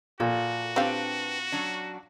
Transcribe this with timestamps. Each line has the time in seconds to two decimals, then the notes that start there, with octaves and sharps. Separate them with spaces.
0.20 A#2 F#4 A4
0.76 C4 D4 G4 B4 F5 G5
1.52 F#3 C#4 D4